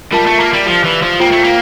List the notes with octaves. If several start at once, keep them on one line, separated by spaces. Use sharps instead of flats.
G3 F4 A#4 E5 A5
A3
A#3
G3
F3 G4 D5 F5
E3
F3
A#3 F4 C5 G5
A3
A#3